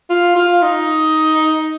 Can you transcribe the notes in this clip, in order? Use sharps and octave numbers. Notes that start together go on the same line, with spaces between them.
F4
F4
D#4